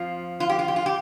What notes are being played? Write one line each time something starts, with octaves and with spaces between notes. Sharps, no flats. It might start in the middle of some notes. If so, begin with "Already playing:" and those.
Already playing: F2 F3 F4
F4
G4
F4
G4
F4
G4